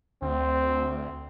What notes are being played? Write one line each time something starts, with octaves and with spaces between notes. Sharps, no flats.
D2 C4